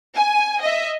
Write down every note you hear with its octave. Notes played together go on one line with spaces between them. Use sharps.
G#5
D#5 E5